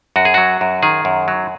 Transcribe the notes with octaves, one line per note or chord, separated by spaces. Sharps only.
F#2 F#4
G#4
F#3 F#4
F#2
D#3 G#4
F#2
F#3